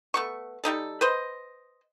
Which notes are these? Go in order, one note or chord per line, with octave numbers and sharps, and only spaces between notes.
A3 B3 C#6
G3 A#3 D#4 A4
B4 C5 D#5